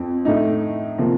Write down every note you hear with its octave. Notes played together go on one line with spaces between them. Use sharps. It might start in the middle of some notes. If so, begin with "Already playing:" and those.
Already playing: F2 C4
A2 A3 D#4
C3 F3 A#3